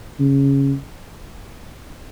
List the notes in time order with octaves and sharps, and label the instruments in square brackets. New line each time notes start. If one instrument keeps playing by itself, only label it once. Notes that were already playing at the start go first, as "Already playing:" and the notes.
[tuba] C#3